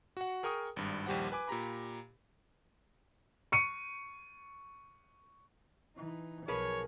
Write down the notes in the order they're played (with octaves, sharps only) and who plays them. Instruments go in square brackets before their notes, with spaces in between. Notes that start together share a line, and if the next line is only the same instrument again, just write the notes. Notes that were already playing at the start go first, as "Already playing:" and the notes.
[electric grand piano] F#4 F#5
G#4 A#4 G5 C#6 D#6
G#1 G2
A#1 D#2 G3 G4 C5 F#5
B4 G#5 D6
A#2 G4 A#5 B5
[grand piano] C#6 C#7 D#7
[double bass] E3 D#4
[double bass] B1 [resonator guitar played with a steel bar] F3 G#4 B4 [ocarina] A#4 [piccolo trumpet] C#5